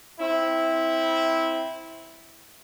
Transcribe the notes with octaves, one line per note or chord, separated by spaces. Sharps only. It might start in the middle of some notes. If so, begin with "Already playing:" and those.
C4 E4